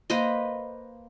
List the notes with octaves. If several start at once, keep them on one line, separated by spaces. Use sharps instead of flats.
A#3 B4 C5 D#5